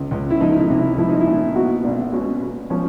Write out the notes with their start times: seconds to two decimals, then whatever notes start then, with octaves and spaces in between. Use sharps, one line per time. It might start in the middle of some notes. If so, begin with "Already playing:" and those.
Already playing: C#2
0.11 C#2
0.30 E4
0.41 F3 D#4
0.52 D#4
0.60 E4
0.69 C2
0.79 E4
0.98 F3 E4
1.09 D#4
1.21 E4
1.27 A#2
1.56 B2 F#4
1.84 B1 D4
2.13 B2 C#4
2.42 B2
2.70 F3 C#4